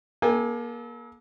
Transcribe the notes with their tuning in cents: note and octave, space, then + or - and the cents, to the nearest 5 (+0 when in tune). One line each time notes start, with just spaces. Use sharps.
A#3 +30 A4 -35 G#5 -35